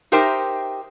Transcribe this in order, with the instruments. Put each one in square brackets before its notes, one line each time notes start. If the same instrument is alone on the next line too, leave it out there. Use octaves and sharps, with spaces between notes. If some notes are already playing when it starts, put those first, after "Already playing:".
[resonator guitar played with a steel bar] D#4 G4 A#4 C5 E5 G5